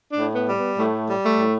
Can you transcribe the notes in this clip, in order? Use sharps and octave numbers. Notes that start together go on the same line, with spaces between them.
D4
A2
B3
G3
B3
A2 A3
G3
A3
A2